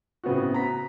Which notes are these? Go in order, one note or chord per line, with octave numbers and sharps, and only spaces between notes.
A2 C#3 B3 C4 F#4
A#5 B6